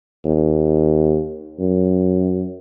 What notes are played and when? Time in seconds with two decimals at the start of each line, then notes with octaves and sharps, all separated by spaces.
0.25 D#2
1.59 F#2